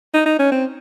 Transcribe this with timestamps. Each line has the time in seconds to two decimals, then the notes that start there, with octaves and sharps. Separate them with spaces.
0.14 D#4
0.26 D#4
0.39 C#4
0.52 C4